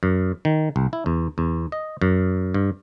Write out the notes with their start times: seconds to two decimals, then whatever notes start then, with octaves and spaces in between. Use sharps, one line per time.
0.03 F#2
0.45 D#3
0.76 C2
0.93 E4
1.06 E2
1.38 E2
1.72 D#5
2.02 F#2
2.54 G2